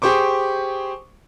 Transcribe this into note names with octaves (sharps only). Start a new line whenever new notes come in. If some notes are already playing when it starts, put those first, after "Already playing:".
G4 G#4 C5 C#6 D6